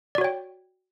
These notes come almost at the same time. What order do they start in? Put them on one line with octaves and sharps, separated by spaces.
D5 F#4 C#5 G5